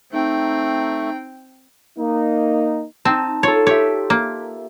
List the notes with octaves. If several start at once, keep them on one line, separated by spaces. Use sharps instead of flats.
A3 C4 D#4 G5
A#3 D#4
C4 D#4 A5
F4 A4 C#5
G4 C#5 E5
A#3